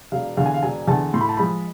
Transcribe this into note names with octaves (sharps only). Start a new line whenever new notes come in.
E1 F5
E2 D3 F5
G#5
F5
E1 G#5
E2 D3 A5
A2 C6
B5
A5
F3 G#3 B5